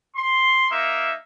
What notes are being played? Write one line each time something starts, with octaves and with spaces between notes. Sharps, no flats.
C6
A#3 D#4 E5